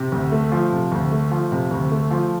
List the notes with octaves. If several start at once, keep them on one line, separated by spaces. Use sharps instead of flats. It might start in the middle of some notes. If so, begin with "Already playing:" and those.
Already playing: C3
D2
A3
F3
C3
D2
A3
F3
C3
D2
A3
F3